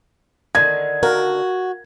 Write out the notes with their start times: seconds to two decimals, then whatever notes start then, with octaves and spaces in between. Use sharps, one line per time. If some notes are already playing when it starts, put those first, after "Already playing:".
0.55 D3 D#3 G#6
1.03 F#4 A#4